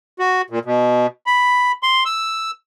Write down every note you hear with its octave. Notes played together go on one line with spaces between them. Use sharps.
F#4
A#2
B2
B5
C6
E6